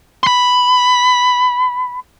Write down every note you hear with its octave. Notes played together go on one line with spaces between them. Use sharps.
B5 C6